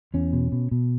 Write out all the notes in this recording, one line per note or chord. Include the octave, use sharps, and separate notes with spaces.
E2 C#4
B2
B2
B2